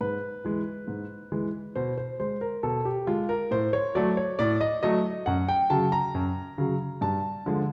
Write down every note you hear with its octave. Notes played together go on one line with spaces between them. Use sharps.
G#2 B4
E3 G#3
G#2
E3 G#3
B2 C5
C5
G#3 C5
A#4
B2 A4
G4
G#3 F4
A#4
A2 C5
C#5
F#3 A3 D5
C#5
A2 D5
D#5
F#3 A3 D#5
F#2 F#5
G5
C#3 F#3 A5
A#5
F#2
C#3 F#3
G2 A5
D3 F3 G#3